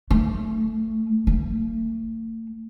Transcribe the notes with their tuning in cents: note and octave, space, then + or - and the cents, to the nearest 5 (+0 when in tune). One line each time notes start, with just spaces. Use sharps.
A3 +10
A3 +45